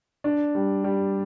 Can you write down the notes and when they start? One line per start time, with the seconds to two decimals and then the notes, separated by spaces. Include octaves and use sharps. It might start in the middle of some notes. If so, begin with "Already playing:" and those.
0.24 D4
0.55 G3
0.84 G3